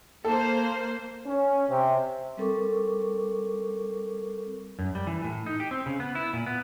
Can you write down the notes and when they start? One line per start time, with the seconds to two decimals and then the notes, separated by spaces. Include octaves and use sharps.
0.25 A#3 A4 C5
1.26 C#4
1.69 C3
2.37 G3 C4 A4 A#4 C#6 D6
4.79 F#2
4.95 G3
5.07 E3
5.25 A2
5.46 D#4
5.60 G4
5.71 C4
5.86 C#3
6.00 B3
6.15 E4
6.33 A#2
6.46 B3